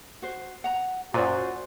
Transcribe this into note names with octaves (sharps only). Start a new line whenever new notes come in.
F#4 C5
F#5 A#5
F#2 A#2 F#4 C5 D5 G#5